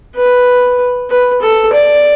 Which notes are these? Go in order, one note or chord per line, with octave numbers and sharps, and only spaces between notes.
B4
B4
A4
D5